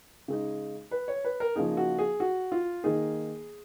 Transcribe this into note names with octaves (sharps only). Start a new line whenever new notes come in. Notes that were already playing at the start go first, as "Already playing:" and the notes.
C#3 G#3 D#4
B4
C#5
B4
A#4
C#3 F3 A#3 D#4 G#4
F#4
G#4
F#4
F4
D#3 A#3 D#4 G#4